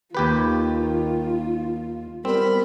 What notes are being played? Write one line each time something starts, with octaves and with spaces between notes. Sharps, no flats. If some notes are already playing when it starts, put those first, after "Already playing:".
D#2 D#3 F4 G4 B4
G3 B3 C4 A#4 B5